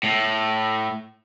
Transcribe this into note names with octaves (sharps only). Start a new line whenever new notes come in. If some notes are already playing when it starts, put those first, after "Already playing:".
A2